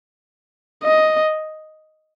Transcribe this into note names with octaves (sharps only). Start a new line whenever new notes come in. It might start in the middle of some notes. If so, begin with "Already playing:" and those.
D#5